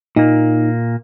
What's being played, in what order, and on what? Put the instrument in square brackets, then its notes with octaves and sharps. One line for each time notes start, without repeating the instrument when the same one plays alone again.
[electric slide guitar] A#2 A#3 [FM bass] D#4